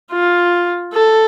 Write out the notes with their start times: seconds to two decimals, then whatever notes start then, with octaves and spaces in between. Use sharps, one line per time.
0.11 F4
0.93 A4